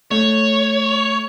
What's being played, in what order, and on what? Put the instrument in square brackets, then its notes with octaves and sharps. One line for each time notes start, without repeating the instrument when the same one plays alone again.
[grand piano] A3 [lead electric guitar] C#5